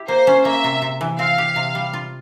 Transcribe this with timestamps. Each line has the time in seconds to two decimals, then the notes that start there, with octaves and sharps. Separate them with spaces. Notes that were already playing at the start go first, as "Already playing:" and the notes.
Already playing: E4 G4
0.08 A#3 C5
0.27 C#4
0.45 A#3 E5
0.64 C3
0.82 C3
1.01 E3
1.19 C4 F5
1.38 G4
1.56 C3
1.75 G3
1.93 F4